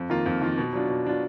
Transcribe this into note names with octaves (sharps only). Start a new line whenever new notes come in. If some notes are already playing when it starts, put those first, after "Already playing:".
Already playing: F2
D#3 A#3 F4
F2
D#3 A#3 F4
B2
F#3 D4 F4
B2
F#3 D4 F4